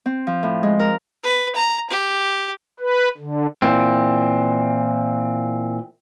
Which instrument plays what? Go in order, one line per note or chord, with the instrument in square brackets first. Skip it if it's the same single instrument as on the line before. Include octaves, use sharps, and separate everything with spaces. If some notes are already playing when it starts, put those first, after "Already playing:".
[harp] C4
F3
A2
G#3
A#4
[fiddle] B4
A#5
G4
[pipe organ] B4
D3
[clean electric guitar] A#2 E3 C4